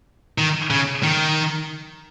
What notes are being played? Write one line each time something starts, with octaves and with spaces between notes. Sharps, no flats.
D#3
C#3
D#3